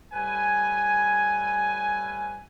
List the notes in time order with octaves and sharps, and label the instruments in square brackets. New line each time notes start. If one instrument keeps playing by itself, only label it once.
[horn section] A2 G3 B4 G#5